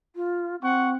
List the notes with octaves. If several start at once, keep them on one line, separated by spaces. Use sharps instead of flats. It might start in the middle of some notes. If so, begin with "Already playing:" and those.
F4
C4 F#5 C#6